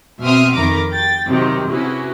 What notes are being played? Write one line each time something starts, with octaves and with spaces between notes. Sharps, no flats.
B2 C4 E5 C6 D#6 F6
F2 D#3 A#4 A#5 B5 D6
G5 A6
C3 D#3 F#3 C4 D#4 G4
C3 C#4 E4 F#4 G#4 B4